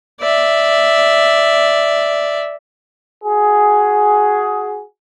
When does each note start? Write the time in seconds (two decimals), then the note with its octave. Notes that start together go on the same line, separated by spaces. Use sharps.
0.20 D5 E5
3.24 F#4 G#4